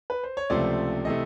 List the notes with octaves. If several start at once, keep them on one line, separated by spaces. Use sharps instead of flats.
B4
C5
C#5
C#2 C3 F3 A3 D5
C3 E3 A3 D#5